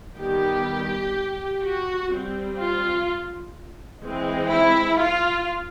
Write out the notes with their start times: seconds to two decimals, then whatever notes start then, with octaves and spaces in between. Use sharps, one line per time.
0.16 D#3 G3 B3 G4
1.61 F#4
2.10 G3 C4
2.58 F4
4.03 E3 G#3 C4
4.51 E4
4.99 F4